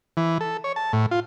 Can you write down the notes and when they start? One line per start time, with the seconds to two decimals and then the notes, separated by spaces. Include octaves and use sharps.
0.17 E3
0.41 A4
0.64 C#5
0.76 A5
0.93 A2
1.11 F4